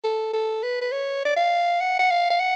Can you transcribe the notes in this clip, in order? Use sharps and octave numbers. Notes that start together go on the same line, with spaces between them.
A4
A4
B4
B4
C#5
D5
F5
F#5
F#5
F5
F5
F#5